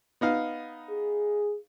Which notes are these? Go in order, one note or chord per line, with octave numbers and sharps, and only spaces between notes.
B3 D#4 F5
G#4